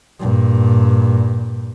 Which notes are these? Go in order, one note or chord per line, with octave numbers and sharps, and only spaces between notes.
G2 A#2